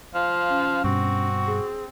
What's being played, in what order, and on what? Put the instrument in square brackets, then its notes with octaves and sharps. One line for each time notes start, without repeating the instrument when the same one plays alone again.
[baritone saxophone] F3 [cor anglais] F5
[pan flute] C#4
[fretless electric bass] G2 B2 [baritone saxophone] C4 [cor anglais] F#4
[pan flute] G#4